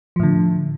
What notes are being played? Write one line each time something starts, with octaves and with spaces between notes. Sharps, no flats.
A2 D3 F3